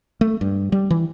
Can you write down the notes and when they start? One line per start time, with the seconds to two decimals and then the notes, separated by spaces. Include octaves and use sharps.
0.21 A3
0.41 G2
0.72 G3
0.90 E3